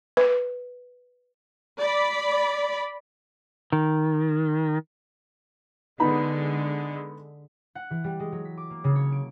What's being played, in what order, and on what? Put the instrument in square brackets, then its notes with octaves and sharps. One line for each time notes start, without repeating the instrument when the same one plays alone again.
[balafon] B4
[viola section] D5 B5
[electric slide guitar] D#3
[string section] D3 G#3 [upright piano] B3 D#4 B5
[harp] F#5
E3
G3
G#3
F#3
B6
D6
A#3
C#3
C#5
D7